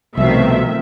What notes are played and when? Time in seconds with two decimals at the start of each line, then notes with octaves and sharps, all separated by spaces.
0.17 C2 B2 D#3 F3 A3 C4 E5